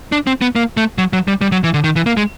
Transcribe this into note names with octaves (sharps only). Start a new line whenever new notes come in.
D4
C4
B3
A#3
A3
F#3
F#3
G3
G3
F#3
E3
D3
D#3
E3
A#3
G#3